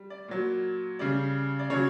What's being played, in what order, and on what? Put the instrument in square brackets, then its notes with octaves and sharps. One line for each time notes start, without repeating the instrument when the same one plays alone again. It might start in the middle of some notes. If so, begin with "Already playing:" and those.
Already playing: [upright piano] G3
D5
A#2 F#3
C#3 G3 D5
D5
C#3 F#3 C#5